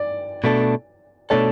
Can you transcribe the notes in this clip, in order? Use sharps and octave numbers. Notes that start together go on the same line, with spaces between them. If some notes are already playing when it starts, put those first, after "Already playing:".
Already playing: D5
B2 A3 D4 A4
B2 A3 D4 A4 C#5